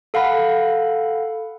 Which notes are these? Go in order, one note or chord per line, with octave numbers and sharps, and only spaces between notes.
A4 F5 F#5 B5